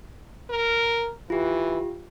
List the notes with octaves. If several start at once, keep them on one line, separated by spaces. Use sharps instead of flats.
A#4
E3 F4 G4